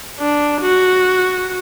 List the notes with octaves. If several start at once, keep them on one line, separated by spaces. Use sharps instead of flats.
D4
F#4